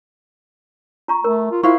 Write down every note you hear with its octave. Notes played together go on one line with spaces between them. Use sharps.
F4 A#5 C#6
A3 A#4
F4
E4 F4 C5 F5 C#6